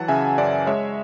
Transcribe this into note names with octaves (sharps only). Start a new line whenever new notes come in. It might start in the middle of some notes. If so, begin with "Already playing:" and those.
Already playing: E3 F#3 F#5 A5
C#3 E5 G#5
F#2 D5 F#5
G#3 C#5 E5